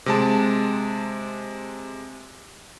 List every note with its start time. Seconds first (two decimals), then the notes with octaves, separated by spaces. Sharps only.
0.06 C3 G#3 A5